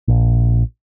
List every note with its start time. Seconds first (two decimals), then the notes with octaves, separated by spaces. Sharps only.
0.08 A#1